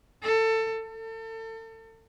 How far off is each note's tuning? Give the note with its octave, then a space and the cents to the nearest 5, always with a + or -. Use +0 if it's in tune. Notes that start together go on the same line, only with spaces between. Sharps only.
A4 +20
A4 +35